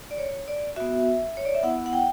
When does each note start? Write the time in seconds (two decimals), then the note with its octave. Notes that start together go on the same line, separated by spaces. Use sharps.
0.11 D5
0.18 C#5
0.48 D5
0.76 B3 F#4 E5
1.37 C#5
1.45 D5
1.55 E5
1.63 B3 E4 F#5
1.86 F#5
1.93 G5